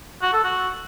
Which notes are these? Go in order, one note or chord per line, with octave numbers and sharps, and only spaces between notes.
F#4
A4
F#4